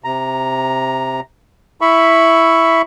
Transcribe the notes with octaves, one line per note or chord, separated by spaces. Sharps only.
C3 A#5
E4 E5 B5 C#6